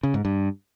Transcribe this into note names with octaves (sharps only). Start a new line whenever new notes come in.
C#3
G#2
G2